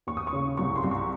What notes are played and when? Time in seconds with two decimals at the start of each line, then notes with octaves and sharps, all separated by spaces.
0.07 D#2 C#6
0.17 D#6
0.27 C#6
0.33 C#3
0.57 C2 C#6
0.76 C6
0.84 C2
0.91 C#6